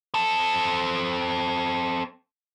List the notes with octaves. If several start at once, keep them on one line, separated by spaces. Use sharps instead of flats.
C4 A4